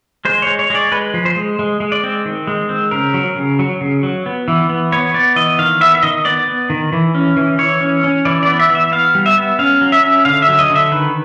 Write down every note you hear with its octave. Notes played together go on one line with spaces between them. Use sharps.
G#3 C5
G#3 C#5
C#5
G#3 D5
G#3 B4
F3
C5
G#3
G#3
G#3
D5
C4
D#3
G#3
C4
C#3 A#4
F#3
C#3
F#3
C#3
F#3
B3
E3
B3
B3 C#5
B3 D5
E3 D#5
D#3 F5
B3 E5
E5
D#3 D#5
B3 D5
B3
D#3
E3
C#4
E3
E3 C#5
C#4
C#4
E3 D5
B3 D5
E5
E3
E5
B3 F5
G3
E5
B3
C#4 F5
F#3
E5
C#4
D3 F5
E5
F#3
D#5
D3
E5
D#3 B4